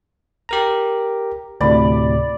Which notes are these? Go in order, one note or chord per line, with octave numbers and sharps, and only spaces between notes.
G4 A#4 A#5
D2 A2 C3 D5 B5